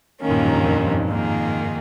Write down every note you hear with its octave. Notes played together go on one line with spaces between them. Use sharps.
D#2 D#3 A#3 C#4
G2 A#2
F2 G#2
G2
F2 G#2
G2
F2
G2
F2 G#2 D#3 A#3 F4 G#4